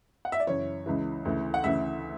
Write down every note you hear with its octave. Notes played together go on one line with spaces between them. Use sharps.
F#5
E5
D5
F#2 C#3 E3 C#5
C#2 C#3 E3
D2 C#3 E3
F#5
D2 C#3 E3 E5